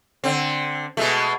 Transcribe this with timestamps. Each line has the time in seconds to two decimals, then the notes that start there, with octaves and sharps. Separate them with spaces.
0.24 D3 C4
0.97 B2 G#3 A3